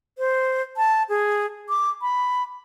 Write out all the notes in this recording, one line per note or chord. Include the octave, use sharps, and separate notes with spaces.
C5
A5
G#4
D6
B5